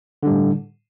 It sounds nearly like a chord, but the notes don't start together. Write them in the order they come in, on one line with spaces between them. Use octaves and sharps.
D3 G3 A2